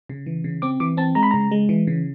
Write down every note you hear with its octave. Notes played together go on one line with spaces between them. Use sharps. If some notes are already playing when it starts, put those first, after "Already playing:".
C#3
E3
C#3
C4 D6
E3 D6
C4 A5
G#3 A#5
B5
C#3 A#5
G#3
E3
C#3